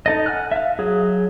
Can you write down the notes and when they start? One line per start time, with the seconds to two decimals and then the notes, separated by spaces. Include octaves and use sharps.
0.06 D#4 A4 D#5
0.26 F#5 G#5 F6 F#6
0.52 E5 F5
0.79 F#3 G#4